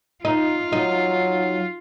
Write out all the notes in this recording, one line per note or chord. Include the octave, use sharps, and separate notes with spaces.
D#4 F4
F#3 D#4